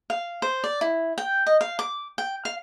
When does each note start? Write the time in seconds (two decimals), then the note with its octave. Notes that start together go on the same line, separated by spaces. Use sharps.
0.10 F5
0.42 C5
0.64 D5
0.81 E4
1.18 G5
1.46 D#5
1.61 F5
1.79 D6
2.18 G5
2.45 F5